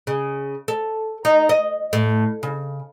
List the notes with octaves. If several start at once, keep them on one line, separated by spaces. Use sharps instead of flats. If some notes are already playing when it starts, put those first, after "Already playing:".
C#3
A4
D#4
D#5
A2
C#3